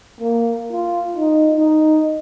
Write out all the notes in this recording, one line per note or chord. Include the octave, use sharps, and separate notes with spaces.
A#3
F4
D#4
D#4